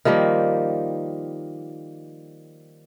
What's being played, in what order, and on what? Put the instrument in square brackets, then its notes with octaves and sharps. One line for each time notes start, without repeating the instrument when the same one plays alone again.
[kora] D#3 F3 G3 A#3